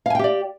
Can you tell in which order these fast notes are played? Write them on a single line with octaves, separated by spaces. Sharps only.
F5 G#5 G5 G4 D5